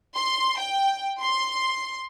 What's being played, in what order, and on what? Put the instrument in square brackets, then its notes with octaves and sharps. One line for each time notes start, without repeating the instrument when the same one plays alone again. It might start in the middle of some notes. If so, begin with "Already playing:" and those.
[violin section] C6
G5
C6